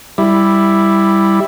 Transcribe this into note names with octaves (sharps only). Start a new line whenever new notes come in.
G3 E4